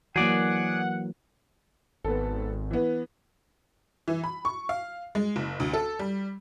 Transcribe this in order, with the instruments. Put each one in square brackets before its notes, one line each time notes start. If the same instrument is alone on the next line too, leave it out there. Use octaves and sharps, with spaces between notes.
[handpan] E3 A#3 [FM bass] F#3 [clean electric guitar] G#4 D5 [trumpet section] F#5
[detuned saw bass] G#1 [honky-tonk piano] B3 A4
[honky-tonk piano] E3 B3
E3
B5
C#6
F5
G#3
F#1
D2
A4
G3